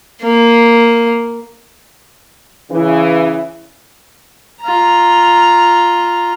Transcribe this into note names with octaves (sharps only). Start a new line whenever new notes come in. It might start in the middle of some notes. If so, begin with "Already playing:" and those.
A#3
C#3 E3
F4 A#5